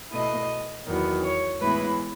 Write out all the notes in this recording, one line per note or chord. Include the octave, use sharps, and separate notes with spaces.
B2 A3 E4 D#5
E2 D#3 F#3 B3
C#5
A2 E3 G#3 B3 E4 B4